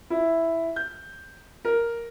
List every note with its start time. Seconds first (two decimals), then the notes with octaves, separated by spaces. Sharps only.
0.10 E4
0.76 G6
1.65 A#4